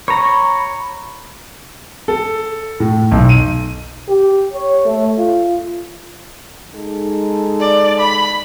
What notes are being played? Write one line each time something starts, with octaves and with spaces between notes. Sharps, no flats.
C#5 A#5 B5
A4
A2
B1
D#7
G4
C#5
A3
F4
G#3 D#4 A4
D5
B5